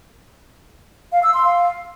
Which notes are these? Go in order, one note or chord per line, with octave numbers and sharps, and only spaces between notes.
F5
E6
C6
F5